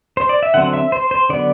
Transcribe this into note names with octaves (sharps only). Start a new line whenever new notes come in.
C5
D5
E5
D3 F#3 C4 F#5
E5
C5
C5
D3 F#3 B3 D5